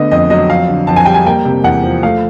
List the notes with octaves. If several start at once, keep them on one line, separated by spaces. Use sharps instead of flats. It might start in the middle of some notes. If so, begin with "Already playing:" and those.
Already playing: D3 A3 B3 D#5
F2 D#5
F#3 D#5
F2 F5
D3
F2 A5
G#5
G3 G5
G#5
A#3 G5
C3
E2 F#5
F3
A3 F5